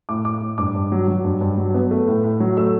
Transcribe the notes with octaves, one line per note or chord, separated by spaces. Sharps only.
A2 D6
A2 D6
A2
G2 D6
G2
F#3
F#3
G2
G2
F#3
B3
A3
A2
A2
F#3
A3 E6